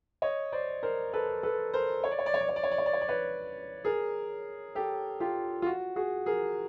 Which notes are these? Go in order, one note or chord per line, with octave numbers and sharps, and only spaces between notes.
C#5 D#5
C5 D5
A#4 C5
A4 B4
A4 B4
A#4 C5
C#5
D5
C#5
D5
C#5
D5
C#5
D5
C#5
D5
C#5
D5
C#5
D5
B4 C#5
G#4 A#4
G4 A4
F4 G4
F4
F#4
F#4 G#4
G#4 A#4